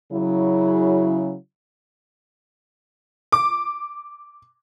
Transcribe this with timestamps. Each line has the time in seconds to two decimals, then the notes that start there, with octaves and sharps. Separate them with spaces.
0.12 C#3 F#3 E4
3.32 D6